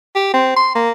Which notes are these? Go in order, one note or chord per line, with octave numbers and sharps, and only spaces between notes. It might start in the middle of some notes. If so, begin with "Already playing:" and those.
G4
C4
C6
A#3